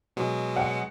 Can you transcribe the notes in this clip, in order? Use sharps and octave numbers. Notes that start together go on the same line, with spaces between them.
B2 F#3 G#3
F#5